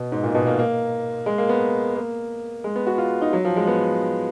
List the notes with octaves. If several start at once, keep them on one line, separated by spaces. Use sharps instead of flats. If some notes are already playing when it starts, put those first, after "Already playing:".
Already playing: B2
G#2
A#2
B2
A#3
A#3
G#3
A#3
B3
A#3
G#3
B3
F#4
F4
D#4
F#3
F3
G#3
B3